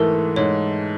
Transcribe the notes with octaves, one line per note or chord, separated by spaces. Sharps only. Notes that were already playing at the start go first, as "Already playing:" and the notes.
Already playing: G#2 E3 A3 A#4
G#2 C#5